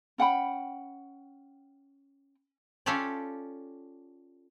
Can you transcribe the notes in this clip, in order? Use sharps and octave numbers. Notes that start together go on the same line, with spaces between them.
C#4 F#5 G5 B5
C#4 F4 G4 A4 C#5 D5